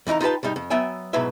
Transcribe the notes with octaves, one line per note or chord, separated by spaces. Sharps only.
F2 E3 D#4 D#5 A#5
D#4 F4 G4 B4 A5
C2 G#2 G3 D#4
F2
F#3 B3 E5 G5 G#5
G#2 B2 F#3 E4 B4 E5